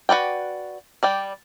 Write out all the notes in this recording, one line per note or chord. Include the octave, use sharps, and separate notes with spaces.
F#4 B4 D5 G5
G3 D5 G5